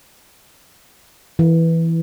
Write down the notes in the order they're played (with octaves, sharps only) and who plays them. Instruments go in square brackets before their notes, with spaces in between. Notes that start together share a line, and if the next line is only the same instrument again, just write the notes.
[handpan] E3